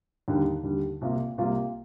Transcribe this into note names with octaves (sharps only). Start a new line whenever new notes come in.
D#2 D3 G3
D#2 D3 G3
C2 C3 G3 A#3 F4
C2 C3 G3 A#3 F4